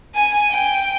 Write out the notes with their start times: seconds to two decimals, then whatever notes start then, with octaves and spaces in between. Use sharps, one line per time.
0.15 G#5
0.52 G5